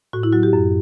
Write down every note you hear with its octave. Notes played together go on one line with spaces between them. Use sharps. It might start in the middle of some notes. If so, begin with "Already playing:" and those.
A2 F#4
E4
F#3 F#4
G4
F#2